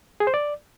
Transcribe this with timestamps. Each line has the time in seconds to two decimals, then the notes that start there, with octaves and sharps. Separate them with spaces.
0.20 G#4
0.27 C5
0.34 D5